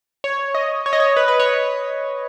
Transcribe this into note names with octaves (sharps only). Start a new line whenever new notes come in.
C#5
D#5
C#5
D#5
C#5
B4
B4
C#5